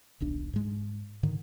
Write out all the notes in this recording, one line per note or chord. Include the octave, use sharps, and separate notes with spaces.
D#1 B1 D4
G#2 G#3
G#2 D3 D#3